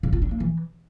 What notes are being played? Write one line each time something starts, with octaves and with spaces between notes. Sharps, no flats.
C#3
F4
D4
A#3
E3